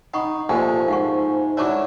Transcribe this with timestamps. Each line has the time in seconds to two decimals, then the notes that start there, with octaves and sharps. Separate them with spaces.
0.14 D#4 F#5 B5 C#6
0.49 A#2 F3 A3 G4 C5 G#5
0.88 G#2 F5 F#5 C#6
1.57 F#3 D4 E4 C#5 A5 C#6